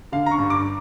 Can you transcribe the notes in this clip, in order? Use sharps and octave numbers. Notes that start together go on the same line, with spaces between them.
D3 F5
A#5
C#6
G2
D6